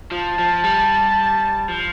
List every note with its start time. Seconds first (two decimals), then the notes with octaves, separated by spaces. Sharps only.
0.12 F3 A5
0.39 F3
0.64 G3
1.68 F3